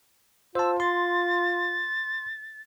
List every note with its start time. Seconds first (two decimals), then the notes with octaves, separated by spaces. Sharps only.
0.55 F4 C5 A5 E6
0.80 C6 A6